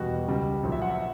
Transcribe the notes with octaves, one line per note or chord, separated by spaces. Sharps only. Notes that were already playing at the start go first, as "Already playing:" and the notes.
Already playing: E1 E2 B2 G3 F#4
C#2 C#3 G3
A#1 A#2 F#3
E5
F#5
E5